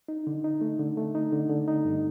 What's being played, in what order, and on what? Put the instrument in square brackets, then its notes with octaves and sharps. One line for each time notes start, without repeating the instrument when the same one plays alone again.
[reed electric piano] D#4
D3
D#4
A3
D3
A3
D#4
D3
D3
D#4
G2